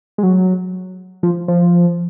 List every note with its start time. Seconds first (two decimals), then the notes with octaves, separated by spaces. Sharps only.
0.18 G#3
0.23 F#3
1.23 F3
1.48 F3